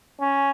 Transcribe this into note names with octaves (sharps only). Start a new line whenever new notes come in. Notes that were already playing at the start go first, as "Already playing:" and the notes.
C#4